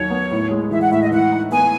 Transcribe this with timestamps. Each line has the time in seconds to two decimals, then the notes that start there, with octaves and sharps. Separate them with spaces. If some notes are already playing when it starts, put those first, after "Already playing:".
Already playing: D#2 D#3 F#3 C#5
0.10 B3
0.31 A2
0.51 G#3
0.71 E3 E5
0.81 F#5
0.91 A2 E5
1.02 D#5
1.11 E3 F#5
1.32 D#4
1.52 B3 G#5